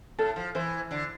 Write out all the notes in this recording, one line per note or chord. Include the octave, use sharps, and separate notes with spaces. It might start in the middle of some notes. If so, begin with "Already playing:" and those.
A2 A4
F3
E3 C5
D3